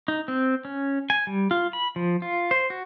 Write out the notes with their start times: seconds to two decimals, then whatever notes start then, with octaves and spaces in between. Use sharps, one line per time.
0.08 D#4
0.28 C4
0.65 C#4
1.10 G#5
1.27 G3
1.51 F4
1.73 B5
1.96 F3
2.22 F4
2.51 C5
2.70 F#4